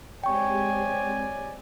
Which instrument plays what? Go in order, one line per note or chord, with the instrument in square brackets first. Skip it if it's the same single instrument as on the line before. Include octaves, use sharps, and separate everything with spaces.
[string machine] G#3 C4 G4 [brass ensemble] C#5 D5 G#5 [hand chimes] G5 C#6